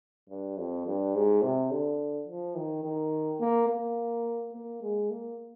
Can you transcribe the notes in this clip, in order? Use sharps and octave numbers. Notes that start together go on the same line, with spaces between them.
G2
F2
G2
G#2
C3
D3
F3
D#3
D#3
A#3
A#3
A#3
G#3
A#3